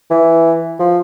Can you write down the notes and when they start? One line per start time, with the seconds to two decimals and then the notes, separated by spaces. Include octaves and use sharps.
0.10 E3
0.79 F3